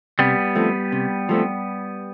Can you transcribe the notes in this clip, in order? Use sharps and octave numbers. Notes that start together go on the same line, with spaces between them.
C3 G3 B3
F3 A3 C4
C3
F3 A3 C4